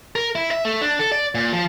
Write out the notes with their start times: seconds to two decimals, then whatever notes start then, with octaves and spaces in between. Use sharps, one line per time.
0.15 A#4
0.35 E4
0.51 E5
0.65 A3
0.82 D4
0.99 A4
1.12 D5
1.35 A#2
1.53 F3